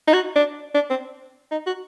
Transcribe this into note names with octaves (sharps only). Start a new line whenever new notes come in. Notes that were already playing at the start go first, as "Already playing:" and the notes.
D#4
F#4
D4
D4
C4
D#4
F#4